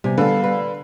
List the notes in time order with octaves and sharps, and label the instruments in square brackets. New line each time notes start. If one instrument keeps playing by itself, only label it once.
[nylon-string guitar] C3 [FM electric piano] G3 B3 G#5
[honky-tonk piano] D3 [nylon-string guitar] A4 B4 [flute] F5
[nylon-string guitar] B4